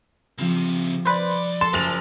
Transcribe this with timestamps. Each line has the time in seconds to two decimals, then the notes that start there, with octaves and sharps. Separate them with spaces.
0.38 C#3 F3 C4 F6
1.05 C2 B4 C5 D5
1.61 A4 A5 C6
1.73 F#1 F4 F7